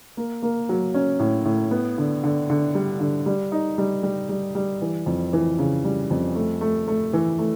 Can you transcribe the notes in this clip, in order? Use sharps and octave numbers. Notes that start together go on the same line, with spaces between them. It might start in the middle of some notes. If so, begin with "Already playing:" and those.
A#3
A#3
F#3
C#4
A2
A2
B3
D3
D3
D3
G3
D3
G3
D#4
G3
G3
G3
G3
E3
F2
E3
C#3
G3
F2
A3
A3
A3
E3
A3